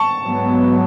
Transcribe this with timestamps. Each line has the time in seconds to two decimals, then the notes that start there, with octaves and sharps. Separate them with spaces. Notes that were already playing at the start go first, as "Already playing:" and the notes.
Already playing: A5 C#6
0.22 G#2 F#3 B3